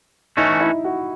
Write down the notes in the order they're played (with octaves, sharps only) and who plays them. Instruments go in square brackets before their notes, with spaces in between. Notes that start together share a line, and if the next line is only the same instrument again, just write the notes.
[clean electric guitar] E3 A3 C#4 F#4 [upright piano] D#4
[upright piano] E4
F#4